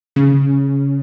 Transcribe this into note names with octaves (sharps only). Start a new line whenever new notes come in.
C#3